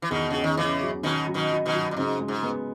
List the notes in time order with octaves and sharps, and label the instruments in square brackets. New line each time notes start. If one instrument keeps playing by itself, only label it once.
[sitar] E3
[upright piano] E2 [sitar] B2 D#3
[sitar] C#3 [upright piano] C#4
[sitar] D#3
[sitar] C#3 E3 [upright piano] C#4
[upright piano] F#3
[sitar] B2 D#3 [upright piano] C#4
[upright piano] F#3
[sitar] B2 D#3
[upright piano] F#3
[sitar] B2 D#3
[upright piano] F#3
[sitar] A#2
[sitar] G#2 [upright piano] C#3
[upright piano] G#3
[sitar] G#2
[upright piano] B3